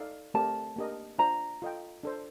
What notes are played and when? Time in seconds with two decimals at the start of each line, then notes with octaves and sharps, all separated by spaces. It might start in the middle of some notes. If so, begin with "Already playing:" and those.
Already playing: D#4 A4 D5 F5
0.34 A3 C4 G4 A#4 D5 A5
0.76 A#3 D4 G4 A#4 D#5
1.18 D4 F4 C5 A#5
1.62 F4 A4 D#5 G5
2.03 D4 A4 C5